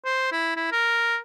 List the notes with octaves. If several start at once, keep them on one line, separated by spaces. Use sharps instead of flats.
C5
E4
E4
A#4